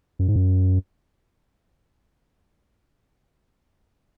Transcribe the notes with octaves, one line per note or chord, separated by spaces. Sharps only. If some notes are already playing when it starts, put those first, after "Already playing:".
F#2
G#2
F#2